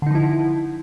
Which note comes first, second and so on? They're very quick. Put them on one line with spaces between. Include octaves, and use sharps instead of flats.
D3 D#4 F3 E4